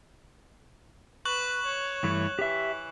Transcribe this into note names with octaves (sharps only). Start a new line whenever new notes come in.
B4 C#6 F#6 F#7
C#5
G2 E3 A3
E3 G4 E5